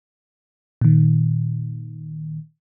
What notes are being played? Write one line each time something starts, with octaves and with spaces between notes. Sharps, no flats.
A#2 D#3